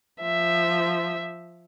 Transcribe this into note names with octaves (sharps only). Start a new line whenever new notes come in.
F3 E5